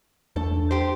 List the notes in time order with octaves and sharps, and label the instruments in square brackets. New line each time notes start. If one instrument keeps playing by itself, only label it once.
[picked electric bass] E2 A3 D4 [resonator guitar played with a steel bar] A4
[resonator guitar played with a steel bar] G4 C5